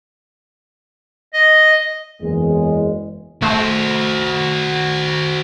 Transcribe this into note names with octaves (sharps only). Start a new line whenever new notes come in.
D#5
F#1 E2 G#3
A3 F#4 C5